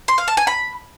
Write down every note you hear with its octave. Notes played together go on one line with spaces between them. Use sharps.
C6
F5
A5
G#5
B5